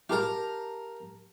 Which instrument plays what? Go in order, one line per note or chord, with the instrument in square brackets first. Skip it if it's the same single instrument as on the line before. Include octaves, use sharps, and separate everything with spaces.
[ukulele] G4 A5 A#5 [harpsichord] A#4 F5